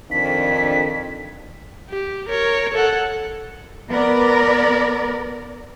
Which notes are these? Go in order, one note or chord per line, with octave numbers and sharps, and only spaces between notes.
F2 D#3 D4 B6
G4
A#4 C#5
A4 F#5
B3 A#4 D5